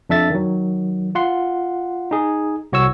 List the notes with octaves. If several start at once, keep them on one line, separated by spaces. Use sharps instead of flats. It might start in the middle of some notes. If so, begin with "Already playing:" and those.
F2 D4 E5 A6
D#3 F#3
F4 F#5 C6
D#4 G#4
C2 F#4 C#5 C#6 E6